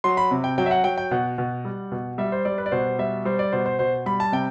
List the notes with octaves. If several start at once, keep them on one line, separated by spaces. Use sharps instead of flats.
F#3 C6
B5
C3
G5
F#3 G5
E5
F#5
F#3 G5
G5
B2 F#5
B2
G3
B2
G3 E5
C5
G3 D5
B4
D5
B2 C5
G3 E5
G3 C5
D5
B2 C5
C5
B2 C5
G3 B5
A5
C3 G5